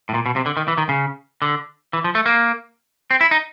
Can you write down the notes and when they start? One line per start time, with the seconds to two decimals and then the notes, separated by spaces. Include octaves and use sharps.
0.09 A2
0.14 A#2
0.26 B2
0.36 C3
0.46 D3
0.57 D#3
0.68 E3
0.78 D#3
0.89 C#3
1.42 D3
1.93 E3
2.04 F3
2.15 A3
2.26 A#3
3.11 C4
3.21 E4
3.31 D#4